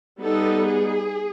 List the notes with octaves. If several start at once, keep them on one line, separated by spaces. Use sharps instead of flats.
G3 B3 D#4 A4
G#4